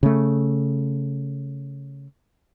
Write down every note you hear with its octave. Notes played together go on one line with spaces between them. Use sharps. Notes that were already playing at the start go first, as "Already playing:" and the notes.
C#3 A3